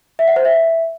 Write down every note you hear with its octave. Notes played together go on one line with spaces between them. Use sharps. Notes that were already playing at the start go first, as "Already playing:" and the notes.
E5
F#5
C5
E5